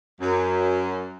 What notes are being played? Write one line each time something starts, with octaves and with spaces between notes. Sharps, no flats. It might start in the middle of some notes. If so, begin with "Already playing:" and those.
F#2